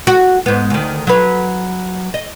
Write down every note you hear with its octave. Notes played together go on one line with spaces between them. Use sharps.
F#4
G#2 B3
D2 D#3
F#3 B4
D#5